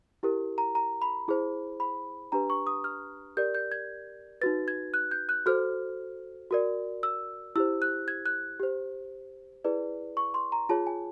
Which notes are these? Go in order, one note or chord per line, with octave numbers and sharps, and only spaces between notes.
E4 G4 A#4
A#5
A#5
B5
E4 G#4 C5
B5
D4 G4 B4 A#5
C#6
D#6
F6
G4 A#4 D5 G6
G6
G#6
D#4 F#4 B4 A6
G#6
F#6
G6
F#6
F#4 A4 C5 F6
F#4 A#4 D5
E6
E4 G4 C5 E6
F#6
G#6
F#6
G4 C5
E4 G#4 B4 D5
C#6
C6
A#5
F4 G#4 C#5 A5
G#5